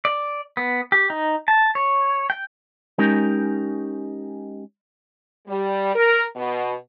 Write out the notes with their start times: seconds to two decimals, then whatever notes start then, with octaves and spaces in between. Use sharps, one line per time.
0.05 D5
0.57 B3
0.92 G4
1.10 D#4
1.48 A5
1.75 C#5
2.30 G5
2.98 G#3 C#4 D#4 G4 A#4
5.48 G3
5.95 A#4
6.36 B2